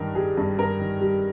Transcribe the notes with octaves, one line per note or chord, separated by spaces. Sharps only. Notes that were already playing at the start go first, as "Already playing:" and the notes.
Already playing: G2 D#3 A#4
G3 G#4
G2
G2 A#4
D#3
G3